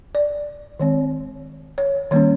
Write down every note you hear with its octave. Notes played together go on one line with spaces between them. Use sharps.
D5
D#3 G#3 C4 C#5
C#5
D#3 G3 A#3 C#4 C#5